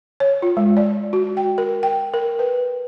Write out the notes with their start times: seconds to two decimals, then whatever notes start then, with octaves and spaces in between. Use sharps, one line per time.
0.20 C#5
0.42 F4
0.57 G#3
0.77 D5
1.13 F#4
1.37 G5
1.58 A#4
1.83 G5
2.14 A#4
2.39 B4